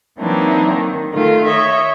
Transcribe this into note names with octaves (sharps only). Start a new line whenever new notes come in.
E3 F#3 A#3 C4 D4 D#4
D#3
D#3 A3 F4
C#5 D#5 E5